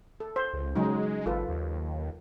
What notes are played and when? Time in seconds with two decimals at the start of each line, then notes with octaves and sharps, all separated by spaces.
0.20 A4
0.36 C5
0.53 C#2
0.75 C#3 F#3 G#3 D#4
1.26 G#1 F4 A4 B4
1.48 D#2